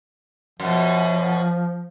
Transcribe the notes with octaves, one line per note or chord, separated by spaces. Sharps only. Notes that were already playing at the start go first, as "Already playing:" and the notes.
F#2 B2 F3